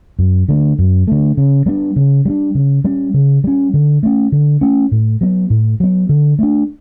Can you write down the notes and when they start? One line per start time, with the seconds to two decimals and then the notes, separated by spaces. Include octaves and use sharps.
0.19 F#2
0.49 D3 A3
0.79 F#2
1.07 D3 A3
1.37 C#3
1.66 G3 B3 D4
1.96 C#3
2.25 G3 B3 D4
2.55 C#3
2.84 G3 C#4
3.14 C#3
3.44 G3 C#4
3.74 D3
4.03 A3 C#4
4.32 D3
4.61 A3 C#4
4.92 A2
5.21 F#3 B3
5.50 A2
5.80 F#3 B3
6.09 D3
6.39 A3 D4